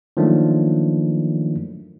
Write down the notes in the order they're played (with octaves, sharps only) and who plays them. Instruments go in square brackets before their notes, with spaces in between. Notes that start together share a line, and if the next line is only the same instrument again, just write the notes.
[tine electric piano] D#3 F3 F#3 A3 A#3 D4